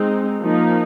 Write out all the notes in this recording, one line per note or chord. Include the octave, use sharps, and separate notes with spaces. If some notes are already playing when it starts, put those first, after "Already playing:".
Already playing: G#3 C4 D#4
F3 A#3 D#4